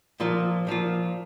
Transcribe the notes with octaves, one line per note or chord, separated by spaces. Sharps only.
A#2 F3 A#3 F4
A#2 F3 A#3 F4